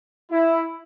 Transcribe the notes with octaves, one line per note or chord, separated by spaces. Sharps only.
E4